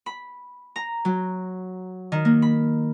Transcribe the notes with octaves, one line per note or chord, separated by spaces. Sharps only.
B5
A#5
F#3
D#3
A#3
B5